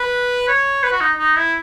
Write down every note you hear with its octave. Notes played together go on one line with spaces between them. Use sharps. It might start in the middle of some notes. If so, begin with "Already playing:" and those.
Already playing: B4
C#5
B4
F#4
D#4
D#4
E4